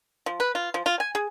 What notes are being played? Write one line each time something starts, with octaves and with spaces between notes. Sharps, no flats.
F3
B4
F4
F3
F4
G#5
G#4